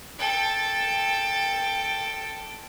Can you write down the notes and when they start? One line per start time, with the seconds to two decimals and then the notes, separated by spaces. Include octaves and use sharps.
0.19 A4 G5